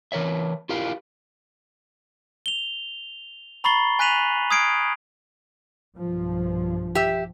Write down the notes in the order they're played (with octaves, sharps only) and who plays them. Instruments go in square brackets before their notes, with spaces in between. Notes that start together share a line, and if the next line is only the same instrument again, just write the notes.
[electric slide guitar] E3 A#4 C#5 E5
E4 F4 G4 A#4 F5
[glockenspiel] F7 G7
A#5 B5 C#6 A6 C7 G7
G#5 F#6 B6 D#7 F7 F#7
D#6 F6 G#6 C7 D7
[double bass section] B1 G2 F3
[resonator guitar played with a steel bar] G4 E5